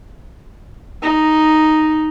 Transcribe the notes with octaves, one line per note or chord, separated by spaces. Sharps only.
D#4